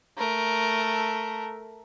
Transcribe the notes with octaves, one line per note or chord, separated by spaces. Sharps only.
A3 A#4